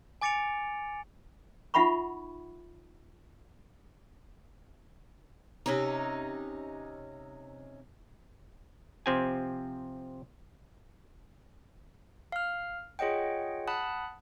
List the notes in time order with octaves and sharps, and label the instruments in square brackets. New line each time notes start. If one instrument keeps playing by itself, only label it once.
[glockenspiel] G#5 D6 A6 C#7 D7 F7
[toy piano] D#4 F4 E5 F#5 B5 C#6
[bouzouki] C3 C#4 D#4
[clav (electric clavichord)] C3 F3 C4 G4 G#5
[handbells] F5 F6
F4 G#4 C#5 D#5 F#5 G5
F#5 A5 B5 D#6 F#6